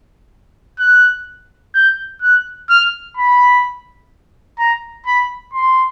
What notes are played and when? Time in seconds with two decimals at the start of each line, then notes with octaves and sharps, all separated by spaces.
0.79 F#6
1.75 G6
2.22 F#6
2.69 F6
3.17 B5
4.58 A#5
5.06 B5
5.53 C6